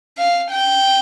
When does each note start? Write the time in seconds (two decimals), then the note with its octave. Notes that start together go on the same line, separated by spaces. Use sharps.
0.18 F5
0.51 G5